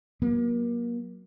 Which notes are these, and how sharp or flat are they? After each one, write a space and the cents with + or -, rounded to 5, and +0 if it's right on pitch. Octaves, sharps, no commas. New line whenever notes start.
F#3 +0 A#3 +30